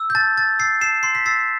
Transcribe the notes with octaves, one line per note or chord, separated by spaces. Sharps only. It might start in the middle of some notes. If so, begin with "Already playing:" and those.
Already playing: E6
G6
A5 A6
A5 A6
E6 A6 C7
A5 C7 E7
C6 C7
B6
E6 A6 C7